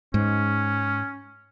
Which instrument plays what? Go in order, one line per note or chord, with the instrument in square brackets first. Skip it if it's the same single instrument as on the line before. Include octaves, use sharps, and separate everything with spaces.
[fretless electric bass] G#2 [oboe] C#4